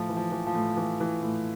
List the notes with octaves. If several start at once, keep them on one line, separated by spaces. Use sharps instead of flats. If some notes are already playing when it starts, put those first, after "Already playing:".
Already playing: A2 F3
E3
F3
E3
F3
A2
E3
E3
A2